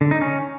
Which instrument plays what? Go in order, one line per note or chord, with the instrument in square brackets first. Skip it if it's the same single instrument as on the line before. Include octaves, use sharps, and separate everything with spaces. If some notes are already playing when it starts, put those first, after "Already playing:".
[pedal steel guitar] D3
D#4
C#4